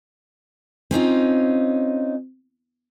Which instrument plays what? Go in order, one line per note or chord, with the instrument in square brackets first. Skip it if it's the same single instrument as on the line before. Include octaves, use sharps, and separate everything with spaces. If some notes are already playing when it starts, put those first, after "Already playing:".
[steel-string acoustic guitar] C4 C#4 D#4 F4